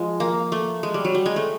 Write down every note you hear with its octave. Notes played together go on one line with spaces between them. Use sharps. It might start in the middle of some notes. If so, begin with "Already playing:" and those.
Already playing: F3 G#3
A#3
A3
G#3
G3
F#3
G3
G#3
A3